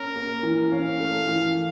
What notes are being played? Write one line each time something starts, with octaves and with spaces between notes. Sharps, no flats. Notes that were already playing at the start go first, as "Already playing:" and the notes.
Already playing: A#3 C#4 A#4
A#3
E3
C#4 F5
A3
E3